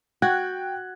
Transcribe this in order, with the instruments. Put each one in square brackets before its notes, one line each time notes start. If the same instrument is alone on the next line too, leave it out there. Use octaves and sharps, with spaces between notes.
[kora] F#4 [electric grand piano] G5 F#6 G#6